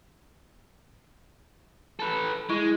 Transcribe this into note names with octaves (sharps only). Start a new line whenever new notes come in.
A4 B4
G#3 E4